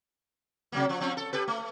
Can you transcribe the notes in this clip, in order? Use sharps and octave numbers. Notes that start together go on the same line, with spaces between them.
C3 F#3 A#3
F3
F3 C4 C#4
A4
G4 A4 B4
A3